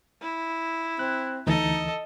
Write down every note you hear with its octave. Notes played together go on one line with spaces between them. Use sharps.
E4
C4 F#6
D2 E3 D#4 A4 D#5